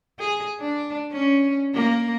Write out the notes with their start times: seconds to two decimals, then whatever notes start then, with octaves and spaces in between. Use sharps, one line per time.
0.19 G#4
0.60 D4
1.12 C#4
1.74 A#3